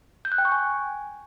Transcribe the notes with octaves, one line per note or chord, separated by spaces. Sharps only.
G6
F#6
G5
C#6
G#5